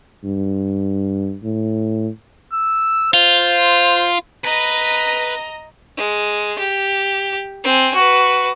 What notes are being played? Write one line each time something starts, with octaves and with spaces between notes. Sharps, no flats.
G2
A2
E6
F4 C5
B4 D#5 A#5
G#3
G4
C4 G#5
F#4 B4